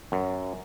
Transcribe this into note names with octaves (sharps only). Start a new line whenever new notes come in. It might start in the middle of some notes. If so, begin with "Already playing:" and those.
F#2